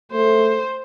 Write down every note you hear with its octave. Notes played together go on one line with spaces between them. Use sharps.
A3 C5